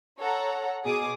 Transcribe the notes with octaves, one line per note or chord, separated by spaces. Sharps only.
A4 C#5 F#5 A#5
B2 G#4 D6 D#6